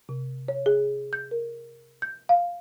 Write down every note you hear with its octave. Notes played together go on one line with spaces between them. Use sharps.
C3
C#5
G#4
G6
A#4
G6
F5